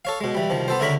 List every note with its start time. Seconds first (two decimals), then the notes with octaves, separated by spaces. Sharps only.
0.05 A4 C#5 F5
0.21 B2 G#3
0.35 E3 G3
0.50 C2 D#3 F3
0.68 B3 A4 C5
0.80 C#2 D3 E4 A#4 C#5 B5